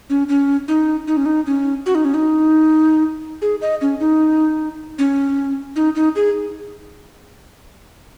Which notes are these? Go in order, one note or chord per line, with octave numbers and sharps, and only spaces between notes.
C#4
C#4
D#4
D#4
C#4
D#4
C#4
F#4
D#4
C#4
D#4
G#4
D#5
C#4
D#4
C#4
D#4
D#4
G#4